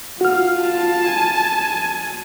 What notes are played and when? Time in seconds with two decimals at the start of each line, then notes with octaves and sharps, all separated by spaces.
0.21 F4 F#4 F6
0.64 A5
1.10 G#5